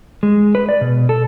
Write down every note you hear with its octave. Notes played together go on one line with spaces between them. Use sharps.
G#3
B4
D5
B2
A4